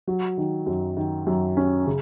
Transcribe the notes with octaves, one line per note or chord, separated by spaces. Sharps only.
F#3
D#3
F#2
D#3
F#2
C#4
C#3